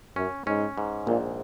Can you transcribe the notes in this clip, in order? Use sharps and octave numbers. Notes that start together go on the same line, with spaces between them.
F#2 C#4
G#2 C#4
G#2
A#1 A#2